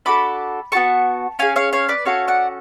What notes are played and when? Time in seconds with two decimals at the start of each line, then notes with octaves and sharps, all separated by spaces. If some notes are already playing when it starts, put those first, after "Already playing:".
0.05 D4 F#4 A4 B5 D6
0.72 B3 F#4 A4 A5 C#6
1.39 C#4 G#4 F5 G#5
1.56 C#5 F5
1.73 C#5 F5
1.89 B4 D5
2.05 C#4 F#4 A4 C#5 F5
2.28 D5 F#5